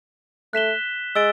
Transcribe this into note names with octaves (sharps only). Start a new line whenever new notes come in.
A3 F#6 B6 E7 G7
G#3 E6 A6 D7 G7